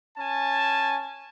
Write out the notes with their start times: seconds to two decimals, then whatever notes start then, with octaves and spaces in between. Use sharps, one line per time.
0.17 C#4 G#5 A5